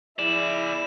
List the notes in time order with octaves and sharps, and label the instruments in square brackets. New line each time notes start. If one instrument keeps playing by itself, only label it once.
[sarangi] E4 [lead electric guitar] G#4 D5 [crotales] E7